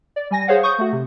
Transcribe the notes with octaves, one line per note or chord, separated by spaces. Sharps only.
D5
G3 G#5 A#6
G#4 C5 C#5 F5 F#5
C#6 D#6 G6
A3 F#4
C3